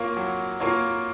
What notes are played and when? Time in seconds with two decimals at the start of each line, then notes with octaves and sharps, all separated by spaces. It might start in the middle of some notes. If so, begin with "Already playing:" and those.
Already playing: A#3 F4 A#4 C#5
0.17 F#3
0.60 A#3 F4 A#4 C#5